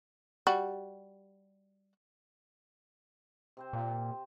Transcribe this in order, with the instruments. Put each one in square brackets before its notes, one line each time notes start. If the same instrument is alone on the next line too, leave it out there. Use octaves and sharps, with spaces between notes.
[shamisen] G3 F#4
[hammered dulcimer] C3 C4 C5
[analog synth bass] A#2